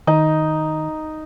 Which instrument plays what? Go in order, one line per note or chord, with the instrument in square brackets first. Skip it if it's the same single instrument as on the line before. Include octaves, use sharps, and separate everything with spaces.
[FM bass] D#3 [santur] D#4